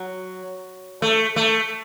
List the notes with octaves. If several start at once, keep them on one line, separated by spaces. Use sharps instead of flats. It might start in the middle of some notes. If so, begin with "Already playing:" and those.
Already playing: F#3
A3
A3